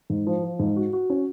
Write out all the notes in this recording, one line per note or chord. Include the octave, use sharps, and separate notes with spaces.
G#2
F3
F3
G#2
F#4
F#4
C#4